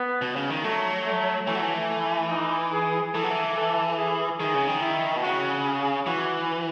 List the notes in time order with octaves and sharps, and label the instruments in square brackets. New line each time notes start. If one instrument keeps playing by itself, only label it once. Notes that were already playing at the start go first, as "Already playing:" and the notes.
Already playing: [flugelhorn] B3
[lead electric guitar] B2
C#3
D#3
[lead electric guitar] F#3 [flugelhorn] A3
[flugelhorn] A3
[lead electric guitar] E3 [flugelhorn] A3
[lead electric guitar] F#3
E3
[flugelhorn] A3
D#4
G#4
[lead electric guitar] E3 [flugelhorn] A4
[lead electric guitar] F#3
E3
[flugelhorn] A4
G#4
[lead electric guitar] D#3 [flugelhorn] G#4
[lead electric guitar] C#3
D#3
[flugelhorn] E4
[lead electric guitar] B2
[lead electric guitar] C#3 [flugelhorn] F#4
[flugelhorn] G#4
[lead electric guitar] E3 [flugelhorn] F#4